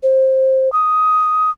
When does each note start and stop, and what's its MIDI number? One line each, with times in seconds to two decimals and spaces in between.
0.03 0.72 72
0.73 1.50 87